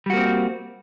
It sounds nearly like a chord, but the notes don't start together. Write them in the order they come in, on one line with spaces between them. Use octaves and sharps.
G3 F#4 A#3 C4